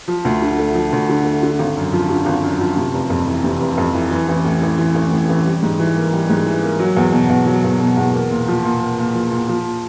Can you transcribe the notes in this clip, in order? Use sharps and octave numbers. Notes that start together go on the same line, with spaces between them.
F3
D2
D3
A3
F3
D2
D3
A3
D3
G#1
F#2
F3
D3
G#1
F#2
F3
C3
F1
F2
E3
C3
F1
F2
E3
E3
A1
A2
A1
E3
A1
A2
A1
G3
G#2
E3
A#3
G3
G#2
E3
A#3
F#3
E2
B2
E2
F#3
E2
B2
E2
A#3
A#2
F3
A#2
A#3
A#2
F3
A#2
F3